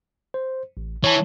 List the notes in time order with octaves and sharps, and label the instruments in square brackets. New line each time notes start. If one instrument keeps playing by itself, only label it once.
[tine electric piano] C5
A1
[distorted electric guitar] E3 [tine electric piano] C#5 A5